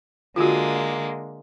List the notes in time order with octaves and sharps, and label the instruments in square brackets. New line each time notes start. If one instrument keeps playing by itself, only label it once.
[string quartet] D3 G#3 A#3 [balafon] F4 F#4